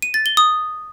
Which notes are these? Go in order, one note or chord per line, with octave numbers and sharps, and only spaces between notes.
D#7
A6
G7
D#6